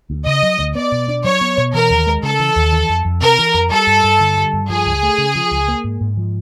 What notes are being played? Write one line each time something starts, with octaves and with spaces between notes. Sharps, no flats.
D2
C#3 D#5
F#3
D2
B3 D5
B2
D4
F#3 C#5
B3
B2
E3 A#4
D#2
G#3
C#3 A4
E3
D#2
E3
F2
F2
C3 A#4
E3
F2
G3 A4
G2
G2
D3
G3
G2
F3 G#4
C#2
A3
C#3
F3
C#2
A#3
G#2
G#2
F3